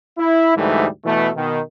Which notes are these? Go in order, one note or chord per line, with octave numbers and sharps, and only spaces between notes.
E4
D2 G#2 E3 G3 A3
B2 E3 A3
B2 D#3